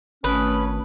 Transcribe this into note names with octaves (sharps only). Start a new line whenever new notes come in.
G#1 A3 C#4 B4 D#6